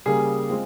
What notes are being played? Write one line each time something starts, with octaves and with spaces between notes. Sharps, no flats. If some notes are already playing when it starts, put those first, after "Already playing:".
C#3 G3 A#3 G#4
G#3 C4 F4